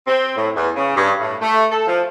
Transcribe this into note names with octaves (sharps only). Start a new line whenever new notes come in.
C4
A2
E2
C#3
G2
A2
A3
A4
F3